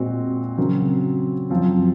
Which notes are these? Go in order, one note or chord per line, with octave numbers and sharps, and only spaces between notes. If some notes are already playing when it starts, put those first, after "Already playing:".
Already playing: A#2 G#3 C4 F#4
C#3 F#3 C4 F#4 A#4
F#2 F3 C4